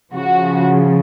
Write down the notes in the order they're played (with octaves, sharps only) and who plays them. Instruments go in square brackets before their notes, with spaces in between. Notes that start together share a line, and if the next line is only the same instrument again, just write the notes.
[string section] C#3 F3 F#4